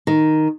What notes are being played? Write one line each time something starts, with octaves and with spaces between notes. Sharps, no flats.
D#3